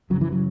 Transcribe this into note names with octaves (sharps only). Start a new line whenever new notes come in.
F#2 C#3 F#3
E3
F#3